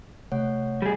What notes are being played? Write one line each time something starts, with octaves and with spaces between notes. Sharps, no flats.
C3 A3 C#5 F#5
G3 G#4